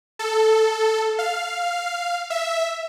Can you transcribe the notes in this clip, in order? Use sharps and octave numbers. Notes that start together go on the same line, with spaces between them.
A4
F5
E5